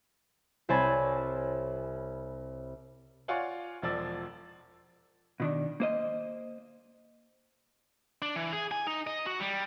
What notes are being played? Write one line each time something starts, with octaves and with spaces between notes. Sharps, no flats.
C2 C5 C#5 G#5 A5 B5
F4 C#5 D5 F5 F#5 G#5
E1 F3 D5 E6
B2 D#3 D4
A#3 C5 D#5
D4
E3
G#4
G#5
D#4
D#5
F#4
G3